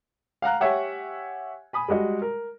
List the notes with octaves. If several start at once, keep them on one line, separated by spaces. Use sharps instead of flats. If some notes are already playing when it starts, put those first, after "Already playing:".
F5 F#5 A#5 F#6
G4 C#5 E5 F#5 G#5
G#5 B5 D#6
G3 G#3 F#4 D#5
A#4